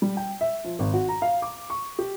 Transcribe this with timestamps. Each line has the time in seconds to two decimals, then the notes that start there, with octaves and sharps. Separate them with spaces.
0.02 G3
0.17 G5
0.41 E5
0.64 F3
0.79 G#1
0.93 F#4
1.09 A#5
1.22 F5
1.42 D6
1.70 C#6
1.99 G4